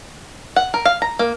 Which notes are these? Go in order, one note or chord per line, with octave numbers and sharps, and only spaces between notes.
F#5
A#4
F5
A#5
A#3